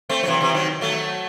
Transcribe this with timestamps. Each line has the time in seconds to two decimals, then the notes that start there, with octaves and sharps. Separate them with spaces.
0.09 A3 C4
0.23 F#3
0.28 C3 E3
0.41 C3 E3
0.54 D#3 F#3
0.81 F#3 A3